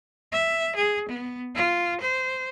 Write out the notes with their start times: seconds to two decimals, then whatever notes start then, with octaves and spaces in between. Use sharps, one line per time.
0.32 E5
0.76 G#4
1.09 B3
1.55 F4
2.01 C5